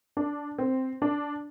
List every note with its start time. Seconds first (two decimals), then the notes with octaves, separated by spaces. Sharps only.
0.17 D4
0.58 C4
1.02 D4